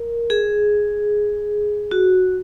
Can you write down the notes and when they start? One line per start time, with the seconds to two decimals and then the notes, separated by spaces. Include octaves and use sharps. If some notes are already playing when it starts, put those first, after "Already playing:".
Already playing: A#4
0.30 G#4
1.91 F#4